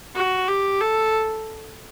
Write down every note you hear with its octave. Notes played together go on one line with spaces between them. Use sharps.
F#4
G4
A4